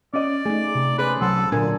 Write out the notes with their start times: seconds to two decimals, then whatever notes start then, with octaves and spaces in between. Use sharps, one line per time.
0.14 C#4 D5 D#5
0.46 A3 D#4 G#4
0.75 C3
0.98 C#4 G#4 B4 C5
1.21 C2 F#3 A4 C6
1.52 A#2 D3 F#3 D4 A#4 G#5